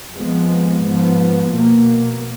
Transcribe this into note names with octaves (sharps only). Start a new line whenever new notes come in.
F2 F3 G#3 B3
G#2 F3 B3
B2 A#3